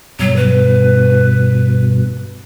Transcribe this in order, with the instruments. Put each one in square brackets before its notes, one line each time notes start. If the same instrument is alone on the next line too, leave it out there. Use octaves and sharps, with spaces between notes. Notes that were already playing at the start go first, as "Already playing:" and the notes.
[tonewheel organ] G2 B2 [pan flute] F#3
[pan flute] B4